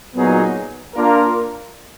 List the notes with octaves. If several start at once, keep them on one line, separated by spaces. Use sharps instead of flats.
A#2 F#3 B3 D#4 G#4
A#3 D4 F4 A#4